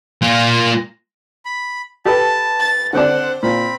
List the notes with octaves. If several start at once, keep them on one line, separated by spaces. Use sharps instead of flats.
A#3 F4
B5
G4 A4 B4 A5
A6
D3 C4 D4 C5 F#5
A#2 C4 B5